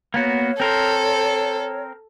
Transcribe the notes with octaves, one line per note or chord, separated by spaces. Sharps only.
A#3 B3 F#4 C#5
C4 A4 A#4 C5